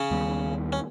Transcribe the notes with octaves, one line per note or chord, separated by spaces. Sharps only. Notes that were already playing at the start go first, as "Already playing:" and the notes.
Already playing: C#3 C#4
D#2 D#3 G3 B3
C#4